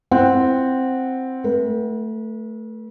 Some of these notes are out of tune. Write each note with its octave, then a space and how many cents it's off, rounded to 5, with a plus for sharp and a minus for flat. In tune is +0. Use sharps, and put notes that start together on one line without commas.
C4 +0 E4 +5 F#5 +0
A3 +5 B4 -40